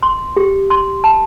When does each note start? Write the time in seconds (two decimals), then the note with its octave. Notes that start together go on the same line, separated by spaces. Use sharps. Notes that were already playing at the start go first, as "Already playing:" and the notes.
0.03 C6
0.36 G4
0.70 C6
1.04 A5